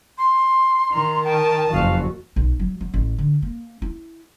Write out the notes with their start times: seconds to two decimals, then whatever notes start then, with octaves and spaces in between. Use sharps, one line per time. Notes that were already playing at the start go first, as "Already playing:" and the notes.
0.17 C6
0.93 D#3 A#5
1.24 A#4 G5 A5 D#6
1.72 F#1 F2 F#4 F5
2.36 B1
2.59 F#3
2.81 F#3
2.94 A1
3.18 D3
3.42 A#3
3.82 E4